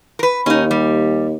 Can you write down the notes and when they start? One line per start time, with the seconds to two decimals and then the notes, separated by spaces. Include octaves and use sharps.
0.19 A#4 B4
0.46 D#2 C#4 D#4
0.71 G3